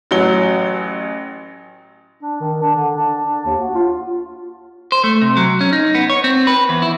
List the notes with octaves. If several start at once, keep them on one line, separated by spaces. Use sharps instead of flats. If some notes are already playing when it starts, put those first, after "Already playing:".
A1 F#3 G7
D4
D#3
D4
D3
D4
D4
D#2
F#4
F4
C5
A3
C3
F#3
C#4
D#4
B3
C#5
C4
B4
E2
E4